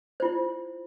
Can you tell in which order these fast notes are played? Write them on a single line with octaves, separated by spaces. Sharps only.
C5 F4 E4